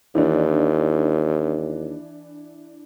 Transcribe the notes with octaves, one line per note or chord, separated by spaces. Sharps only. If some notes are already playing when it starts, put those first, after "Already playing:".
D#2 E3 D4